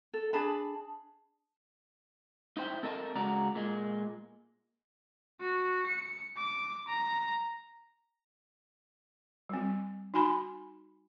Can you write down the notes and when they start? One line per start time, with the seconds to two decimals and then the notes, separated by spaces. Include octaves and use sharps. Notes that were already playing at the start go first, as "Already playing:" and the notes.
0.14 A4
0.33 D4 G#4 A5 B5
2.57 D#4 E4 C5 G5
2.83 C4 A4 A#4 D#5 A5
3.15 C#3 G#3 F#4 D5 A#5
3.55 A#2 G#3
5.40 F#4
5.86 C#7
6.37 D6
6.87 A#5
9.49 G3 C4
10.14 D#4 F#4 G#5 B5 C6